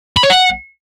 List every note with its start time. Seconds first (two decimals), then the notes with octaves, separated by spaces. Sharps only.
0.17 B5
0.23 C#5
0.30 F#5